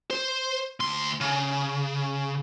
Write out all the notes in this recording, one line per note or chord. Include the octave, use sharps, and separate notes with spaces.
C5
D2 C6
C#3